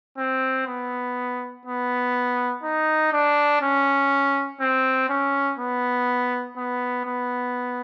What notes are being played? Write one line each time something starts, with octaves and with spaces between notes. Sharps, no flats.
C4
B3
B3
D#4
D4
C#4
C4
C#4
B3
B3
B3